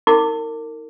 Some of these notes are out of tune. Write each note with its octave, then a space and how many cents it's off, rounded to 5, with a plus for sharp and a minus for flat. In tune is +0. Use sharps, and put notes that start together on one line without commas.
D#4 +40 A#4 -30 D6 +0